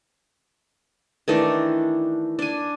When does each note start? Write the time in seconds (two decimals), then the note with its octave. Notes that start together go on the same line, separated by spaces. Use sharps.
1.28 D#3 E3 A3 D4
2.39 D4 G#5